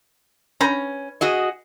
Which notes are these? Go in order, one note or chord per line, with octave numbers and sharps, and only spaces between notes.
C#4 B4 G5 A#5
F#4 G#4 D#5